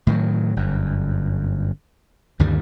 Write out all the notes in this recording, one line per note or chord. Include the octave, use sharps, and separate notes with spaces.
A2 D#3 E3 F#3
G1 F#2
D2 G2 D#3 G3